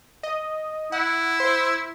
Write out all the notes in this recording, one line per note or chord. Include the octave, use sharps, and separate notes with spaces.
D#5
E4 F#5
C5